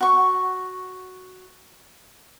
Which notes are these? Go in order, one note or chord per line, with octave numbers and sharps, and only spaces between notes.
F#4 C#6